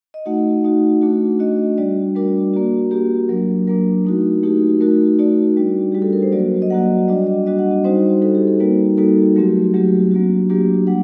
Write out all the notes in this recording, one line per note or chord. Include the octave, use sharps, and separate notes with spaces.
D#5
A3 D#4 F#4 F#5
A3 D#4 F#4
A3 D4 F#4
A3 D4 F#4 D#5
G3 D4 F#4 D5
G3 D4 F#4 A#4
A#3 F#4
A#3 F#4 G4
F#3 A#3 D4 A#4
F#3 A#3 D4 A#4
A3 D#4 F#4
A3 D#4 F#4 G4
A3 D#4 F#4 A#4
A3 D#4 F#4 D5
G3 D4 F#4
G3 D4 F#4 G4
A4
A#4
C5
F#3 A#3 F#4 D5
D#5
F#3 A#3 F#4 F#5
G3 D4 F#4 D#5
D#5
G3 D4 F#4 D#5
F#5
D#5
G3 C4 D#4 F#4 C5
G3 C4 D#4 F#4 A4
G4
A4
G3 A#3 D#4 F#4 A#4
G3 A#3 D#4 F#4 A4
F#3 A3 C4 F#4 G4
F#3 A3 C4 F#4 G4
F#3 A#3 D4 F#4
F#3 A#3 D4 F#4 G4
G3 A#3 D4 F#5